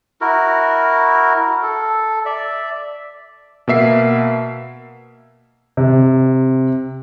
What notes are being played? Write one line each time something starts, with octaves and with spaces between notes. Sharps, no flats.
E4 F#4 A#4
A4
D5 E5
B2 A#3 E5 C7
C3